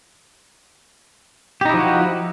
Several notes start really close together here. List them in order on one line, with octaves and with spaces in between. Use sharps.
G4 D#4 E4 F3 F#4